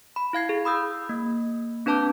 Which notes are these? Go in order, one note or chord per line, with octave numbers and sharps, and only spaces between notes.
B5
E4 F5 G#6 C7
G#4
B5 D#6 E6 G6
A#3
C4 D4 B4 A5 D6 G6